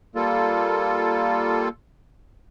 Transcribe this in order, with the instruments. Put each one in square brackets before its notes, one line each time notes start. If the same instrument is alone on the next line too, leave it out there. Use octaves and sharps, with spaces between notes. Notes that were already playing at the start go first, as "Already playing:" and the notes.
[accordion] G3 A#3 F4 A4